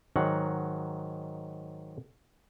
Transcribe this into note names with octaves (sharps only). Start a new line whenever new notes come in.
G#2 D#3 F#3 F#5